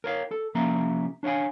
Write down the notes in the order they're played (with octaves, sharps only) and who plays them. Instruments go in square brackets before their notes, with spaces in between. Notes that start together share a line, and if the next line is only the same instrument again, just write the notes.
[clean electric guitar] A#4 C#5 F5
A4
C2 F3 A#3 C#4 E5 A#5
D4 C#5 D5 F5 G#5